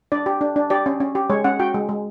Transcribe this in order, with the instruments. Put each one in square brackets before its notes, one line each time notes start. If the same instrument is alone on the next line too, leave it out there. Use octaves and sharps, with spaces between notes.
[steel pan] D4 D5
G4
D4
D4
G4 D5
C#4
C#4
G4
G#3 C#5
C#4 F#5
F#4 G5
G#3
G#3